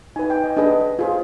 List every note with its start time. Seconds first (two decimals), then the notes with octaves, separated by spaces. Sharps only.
0.16 D#4 B4 G#5
0.30 G5
0.44 D#5
0.57 D4 G#4 B4 D#5
0.99 F4 G#4 C5